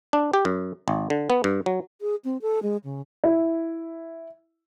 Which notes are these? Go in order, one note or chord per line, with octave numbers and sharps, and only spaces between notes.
D4
G4
F#2
G#1
D3
B3
G2
F#3
G#4
C4
A4
G#3
C#3
E4